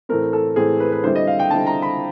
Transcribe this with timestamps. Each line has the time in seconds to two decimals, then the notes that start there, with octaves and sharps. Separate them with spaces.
0.09 A2 E3 A3 C4 A#4
0.33 A4
0.56 A2 E3 A3 C4 G#4
0.80 B4
0.92 B4
1.04 D3 G3 C4 E4 C5
1.16 D#5
1.27 F5
1.39 G5
1.51 D3 G3 C4 E4 A5
1.67 A#5
1.82 B5